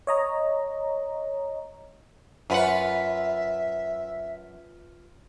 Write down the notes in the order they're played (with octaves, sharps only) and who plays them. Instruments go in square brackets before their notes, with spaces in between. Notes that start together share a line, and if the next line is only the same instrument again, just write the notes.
[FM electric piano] C#5 D#5 A#5
[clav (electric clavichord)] F#2 F#5 [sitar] F4 B4 [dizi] E5